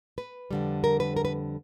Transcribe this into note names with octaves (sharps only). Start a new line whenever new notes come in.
B4
F2 D3 G3
A#4
B4
A#4
B4